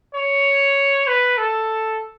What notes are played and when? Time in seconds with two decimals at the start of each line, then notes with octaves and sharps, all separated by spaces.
0.15 C#5
1.07 B4
1.38 A4